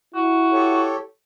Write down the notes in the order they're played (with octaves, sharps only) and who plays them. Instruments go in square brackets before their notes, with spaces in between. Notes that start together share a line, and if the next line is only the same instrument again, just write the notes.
[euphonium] E4 [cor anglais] F#4
[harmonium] G4 A4 C#5